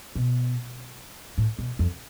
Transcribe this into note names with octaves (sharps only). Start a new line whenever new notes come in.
B2
A2
B2
F2